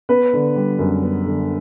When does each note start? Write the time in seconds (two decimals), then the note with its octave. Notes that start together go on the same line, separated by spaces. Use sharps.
0.09 B3 B4
0.33 D3
0.56 G3
0.79 F#2
1.03 B3
1.26 D3